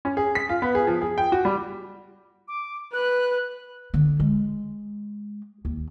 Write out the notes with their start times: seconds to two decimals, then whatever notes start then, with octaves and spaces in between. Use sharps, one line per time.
0.05 C#4
0.17 G#4
0.35 B6
0.49 F4
0.62 B3
0.75 G#4
0.87 F3
1.02 G#4
1.18 G5
1.32 F#4
1.45 G3
2.48 D6
2.94 B4 F#6
3.94 D3
4.20 G#3
5.65 D#2